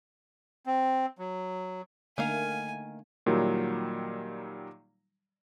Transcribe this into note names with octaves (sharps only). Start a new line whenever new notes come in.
C4
F#3
D3 D#3 A3 A#3 A#4 F5 G#5
A#2 D#3 F#3 G3